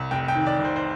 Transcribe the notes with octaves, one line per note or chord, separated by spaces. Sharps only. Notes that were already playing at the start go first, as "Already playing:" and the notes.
Already playing: C2
F1 G5
G5
D#3
D5
F1
C5
C5